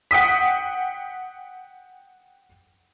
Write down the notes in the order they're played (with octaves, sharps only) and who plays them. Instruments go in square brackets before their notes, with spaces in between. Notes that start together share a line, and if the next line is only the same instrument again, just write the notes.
[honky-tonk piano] F#5 G5 D#6 B6